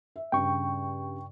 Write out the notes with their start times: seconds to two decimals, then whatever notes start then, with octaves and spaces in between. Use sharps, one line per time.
0.16 E5
0.32 G2 C#3 G5 C#6